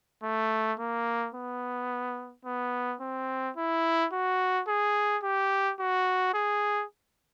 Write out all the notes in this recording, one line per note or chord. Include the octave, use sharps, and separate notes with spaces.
A3
A#3
B3
B3
C4
E4
F#4
G#4
G4
F#4
G#4